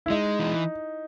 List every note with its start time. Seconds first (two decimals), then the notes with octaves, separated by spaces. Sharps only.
0.06 E4
0.10 G#3 D#4
0.39 E3